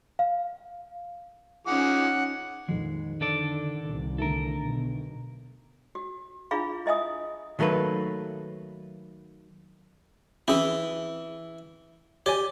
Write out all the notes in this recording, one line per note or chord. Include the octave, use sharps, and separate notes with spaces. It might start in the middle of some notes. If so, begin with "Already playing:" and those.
F5
F3 C#4 D#4 G#4 F#5 D6
A#1 F2 D#3 G#3
D3 D4 A4 D5
C2
D3 A3 A4 A#4
B1 B2
F#4
D4 E4 F4 G#4 F5 B5
E4 D#5 E5 G#5 D#6
D#3 F#3 A3 A#3 B4
E3 C4 C#4 E4 G#4
G4 C#5 D5 G#5